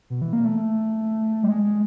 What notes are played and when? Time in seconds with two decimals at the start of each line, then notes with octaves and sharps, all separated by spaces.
0.10 B2
0.22 E3
0.33 A#3
0.45 A3
1.43 G3
1.49 G#3
1.64 G#3